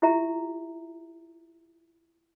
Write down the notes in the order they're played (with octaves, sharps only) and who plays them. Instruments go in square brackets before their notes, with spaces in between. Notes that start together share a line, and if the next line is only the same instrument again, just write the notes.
[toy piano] E4 F4 G4 E5 A#5